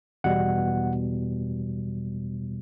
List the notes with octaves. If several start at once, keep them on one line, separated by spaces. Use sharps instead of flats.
E2 B2 G3 F#5